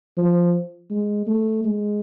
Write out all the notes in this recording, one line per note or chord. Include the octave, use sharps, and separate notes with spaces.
F3
G#3
A3
G#3